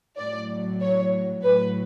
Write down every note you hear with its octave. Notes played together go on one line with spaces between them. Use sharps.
A2 F#3 D5
C#5
A2 F#3 B4